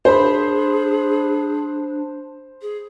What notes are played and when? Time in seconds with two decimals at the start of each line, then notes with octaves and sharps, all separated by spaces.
0.05 D4 G#4 C5 B5
2.62 G#4